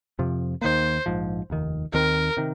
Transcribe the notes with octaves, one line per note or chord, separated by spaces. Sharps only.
F2 C3 F3
D#2 D#3 A#3 C5
A#1 G#2 F3
F1 D#2 D#3
D#2 D#3 C4 A#4
C3 D#3